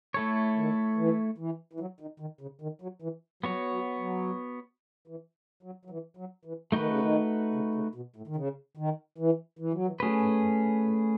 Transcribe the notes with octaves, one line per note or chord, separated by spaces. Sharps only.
A3 E4 A4 C#5
D#3
E3
E3
E3
F#3
D#3
D#3
C#3
D#3
F#3
E3
F#3 B3 F#4 C#5
F#3
F#3
E3
F#3
F#3
E3
F#3
E3
D#3 A3 D#4 F#4 B4
C#3
D#3
C#3
C#3
B2
A2
D#3
C#3
D#3
E3
E3
F#3
E3
F#3 A3 C#4 G#4 B4
G#2
F#2
A2
A2